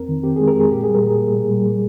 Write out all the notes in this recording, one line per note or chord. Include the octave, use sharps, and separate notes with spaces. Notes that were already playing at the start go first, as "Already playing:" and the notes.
Already playing: F2 C4 A#4
D#3
C4 G4
G#4
G#3
A#4
F2 G#4
A#2 G4
G#4
G3
A#4
A#2 G#4
A#2
A#2
G3
G3